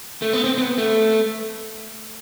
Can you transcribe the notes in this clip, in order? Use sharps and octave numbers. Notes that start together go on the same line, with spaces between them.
A3
B3
C4
C4
B3
A3